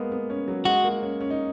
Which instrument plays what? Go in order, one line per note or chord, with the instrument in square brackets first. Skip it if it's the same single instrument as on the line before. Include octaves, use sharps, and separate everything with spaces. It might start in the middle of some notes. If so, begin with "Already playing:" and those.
Already playing: [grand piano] G#3 A#3 B3
B3
C#4
F#3
[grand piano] G#3 [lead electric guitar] F#4
[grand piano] A#3
C#4
C#4
D#4